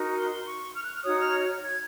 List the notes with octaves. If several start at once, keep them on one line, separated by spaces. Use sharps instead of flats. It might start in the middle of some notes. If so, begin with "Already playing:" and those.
Already playing: D#4 F#4 A#4
C6
C#6
F6
F#6
F6
D#4 F#4 C#5 D#6
F6
G#6